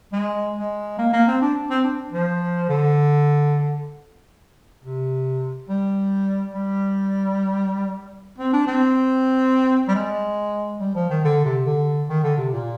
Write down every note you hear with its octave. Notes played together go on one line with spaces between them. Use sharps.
G#3
G#3
A#3
A#3
C4
D4
C4
D4
F3
D3
C3
G3
G3
C4
D4
C4
G3
G#3
G3
F3
D#3
D3
C3
D3
D#3
D3
C3
A#2